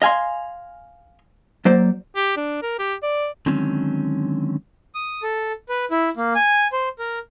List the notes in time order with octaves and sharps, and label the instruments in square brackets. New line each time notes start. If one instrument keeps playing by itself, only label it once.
[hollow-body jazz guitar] D#5 F5 G#5 B5 C6
F#3 A#3 C5 D5
[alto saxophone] G4
D4
A#4
G4
D5
[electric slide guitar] D3 D#3 F#3 G#3 C4 C#4
[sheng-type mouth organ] D#6
A4
B4
E4
A#3
G#5
C5
A#4